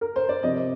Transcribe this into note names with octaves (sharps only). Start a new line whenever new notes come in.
A#4
C5
D5
C3 F3 C4 D#5